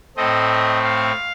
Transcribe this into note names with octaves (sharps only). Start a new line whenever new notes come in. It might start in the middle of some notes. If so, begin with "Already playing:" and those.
A2 A3 C4 D#5
F5